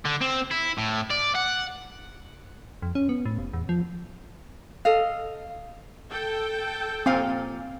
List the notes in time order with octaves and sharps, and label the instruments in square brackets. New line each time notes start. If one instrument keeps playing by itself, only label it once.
[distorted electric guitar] D3
C4
E4
A2
D5
F#5
[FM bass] F2
C#4
B3
A2
F1
E2
F3
[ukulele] A4 D#5 F5
[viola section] A4 G5
[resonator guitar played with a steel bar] A#2 F5 G#5 [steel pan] C4